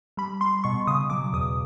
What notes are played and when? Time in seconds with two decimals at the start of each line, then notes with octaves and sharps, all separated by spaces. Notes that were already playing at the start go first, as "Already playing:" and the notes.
0.17 G3 B5
0.41 G3 C6
0.64 B2 C#6
0.87 C#3 D#6
1.10 F#3 D6
1.33 E2 D#6